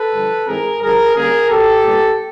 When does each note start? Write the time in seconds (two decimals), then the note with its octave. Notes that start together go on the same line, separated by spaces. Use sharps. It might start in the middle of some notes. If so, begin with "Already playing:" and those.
Already playing: A4 B4
0.12 G2 D3 F3
0.46 G#2 E3 G#3 C4 G#4 A#4
0.80 G2 D3 F3 G#4 A#4
1.14 D3 G3 A#3 C#4 G#4 A#4
1.49 B2 F#3 B3 G4 A4
1.83 A#2 G3 B3